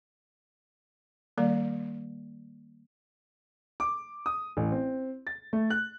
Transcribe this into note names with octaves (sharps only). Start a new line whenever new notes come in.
D#3 G3 A#3 D5
D6
D#6
A1
C4
A6
A3
F#6